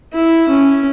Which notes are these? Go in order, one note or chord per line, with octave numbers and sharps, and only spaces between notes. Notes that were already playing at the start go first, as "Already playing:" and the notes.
E4
C#4